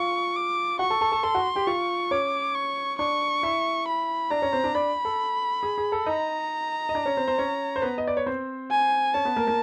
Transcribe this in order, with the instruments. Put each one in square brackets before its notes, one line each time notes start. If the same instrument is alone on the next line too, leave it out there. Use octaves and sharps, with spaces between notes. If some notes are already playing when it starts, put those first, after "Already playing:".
Already playing: [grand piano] F4 F5 [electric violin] C#6
[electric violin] D6
[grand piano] F#4 F#5 [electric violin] C#6
[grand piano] A4 A5
A4 A5
A4 A5
[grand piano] A4 A5 [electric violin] C6
[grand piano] F#4 F#5
G4 G5
[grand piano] F4 F5 [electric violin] C#6
[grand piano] C#4 C#5 [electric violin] D6
[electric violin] C#6
[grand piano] D4 D5 [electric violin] C#6
[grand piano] E4 E5
[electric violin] B5
[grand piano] D4 D5 [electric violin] A#5
[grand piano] C#4 C#5
C4 C5
D4 D5
[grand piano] D4 D5 [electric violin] B5
[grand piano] A4
G#4
G#4
A4
[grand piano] D#4 D#5 [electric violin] A#5
[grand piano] D#5
D4 D5
C#4 C#5
C4 C5
C4 C5
C#4 C#5
C5
B3 B4
D#5
D5
C#5
C4 C5
[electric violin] G#5
[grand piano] C#4 C#5 [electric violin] A5
[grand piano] B3 B4
A#3 A#4
A#3 A#4